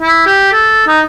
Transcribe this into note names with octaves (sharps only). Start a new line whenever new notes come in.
E4
G4
A4
D#4